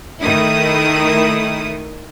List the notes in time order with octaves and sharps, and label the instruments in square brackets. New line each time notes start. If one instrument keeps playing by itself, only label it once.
[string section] D#3 A3 E4 D#6